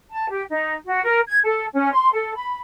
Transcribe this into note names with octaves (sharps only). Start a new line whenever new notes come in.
A5
G4
D#4
F#4
A#4
G#6
A4
C#4
C6
A4
B5